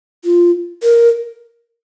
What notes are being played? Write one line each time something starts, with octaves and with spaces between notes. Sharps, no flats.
F4
A#4